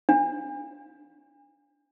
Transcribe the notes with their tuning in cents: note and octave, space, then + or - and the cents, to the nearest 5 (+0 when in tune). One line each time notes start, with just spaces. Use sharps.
D4 -15